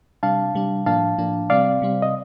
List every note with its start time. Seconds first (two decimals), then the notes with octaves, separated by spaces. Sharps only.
0.23 C3 G3 D4 F5 A5
0.55 C3 G3 D4
0.86 A2 F3 A#3 D4 F5 A5
1.18 A2 F3 A#3 D4
1.50 C3 G3 C4 D5 F5
1.82 C3 G3 C4
2.02 D#5